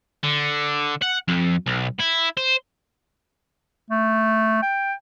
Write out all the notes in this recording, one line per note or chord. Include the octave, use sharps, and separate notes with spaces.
D3
F#5
F2
B1
E4
C5
A3
G5